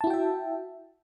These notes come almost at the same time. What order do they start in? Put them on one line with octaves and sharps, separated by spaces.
A5 E4 F#4 G5 E5